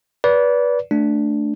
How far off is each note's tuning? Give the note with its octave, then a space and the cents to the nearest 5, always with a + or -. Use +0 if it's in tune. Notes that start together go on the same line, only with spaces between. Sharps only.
B4 -20 D5 -25
A3 +0 D4 +0